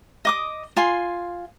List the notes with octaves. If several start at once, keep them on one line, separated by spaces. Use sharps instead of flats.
D#5 D6 D#6
F4 G#5 C6